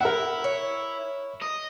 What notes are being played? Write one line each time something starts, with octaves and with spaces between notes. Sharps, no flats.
E4 A#4 E5 F#5
C#5
D#5